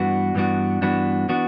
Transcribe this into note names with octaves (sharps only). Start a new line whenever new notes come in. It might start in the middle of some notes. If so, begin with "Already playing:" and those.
Already playing: G2 E3 B3 D4 F#4
G2 E3 B3 D4 F#4
G2 E3 B3 D4 F#4
E3 B3 D4 F#4